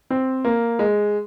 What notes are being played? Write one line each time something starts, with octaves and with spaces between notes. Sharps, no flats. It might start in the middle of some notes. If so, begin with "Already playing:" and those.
C4
A#3
G#3